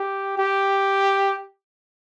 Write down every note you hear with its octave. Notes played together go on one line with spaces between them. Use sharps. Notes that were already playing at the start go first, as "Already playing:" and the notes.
Already playing: G4
G4